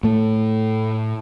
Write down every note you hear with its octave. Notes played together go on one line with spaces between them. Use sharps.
A2 A3